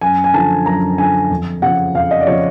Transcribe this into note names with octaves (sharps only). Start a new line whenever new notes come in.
F#2 G#5
G#5
D3 F3 A5
F#2 A#5
D3 F3 G#5
F2
C#3 F3 F#5
F2 F5
D#5
D5
C#3 F3 C#5